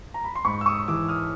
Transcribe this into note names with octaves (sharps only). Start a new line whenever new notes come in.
A#5
B5
C6
G#2 B5 C#6
E6
C#6 D#6
E3 D6 E6
D#6 F6